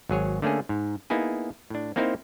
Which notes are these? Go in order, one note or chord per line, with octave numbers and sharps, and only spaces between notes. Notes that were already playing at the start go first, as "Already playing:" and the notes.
G#1 F#3 G#4 C#5
D3 A3 A#3 C#4 G#4
G#2
A#3 B3 D#4 E4 G#4
A2 D4
A#3 C4 D#4 E4 A#4 C5